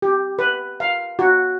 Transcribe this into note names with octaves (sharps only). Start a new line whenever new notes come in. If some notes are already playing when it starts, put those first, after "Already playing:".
G4
B4
F5
F#4